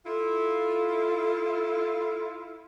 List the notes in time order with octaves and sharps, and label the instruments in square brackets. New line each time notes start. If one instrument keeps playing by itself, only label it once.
[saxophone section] E4 F4 [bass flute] A4